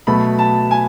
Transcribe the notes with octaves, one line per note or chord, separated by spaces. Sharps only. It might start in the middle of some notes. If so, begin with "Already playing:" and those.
B2 F#3 A3 B5
A5
G#5